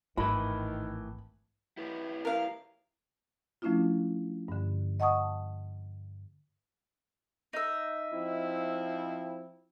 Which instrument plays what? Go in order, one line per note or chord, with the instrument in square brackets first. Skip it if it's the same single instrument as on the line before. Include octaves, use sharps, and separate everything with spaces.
[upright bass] G#1 [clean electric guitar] A2 E3 [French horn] D#3 [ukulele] B5
[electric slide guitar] E4 G4 B4
[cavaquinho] A#4 F5
[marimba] F3 A3 C#4 D4 E4 F4
G2 D3
D#5 F#5 A5 C#6 D#6
[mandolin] D#4 E5
[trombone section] F3 C4 E4